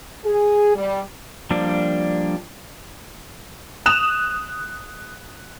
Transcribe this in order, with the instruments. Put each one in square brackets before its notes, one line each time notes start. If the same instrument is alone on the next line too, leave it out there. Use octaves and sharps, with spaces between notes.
[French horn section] G#4
G3
[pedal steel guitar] F3 G3 A#3 D4
[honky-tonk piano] D#6 F#6 E7 F7